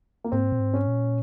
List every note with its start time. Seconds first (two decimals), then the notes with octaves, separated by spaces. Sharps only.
0.24 A#3
0.32 G#2 C4
0.52 A#2
0.60 G#2
0.74 C#4
0.87 A#2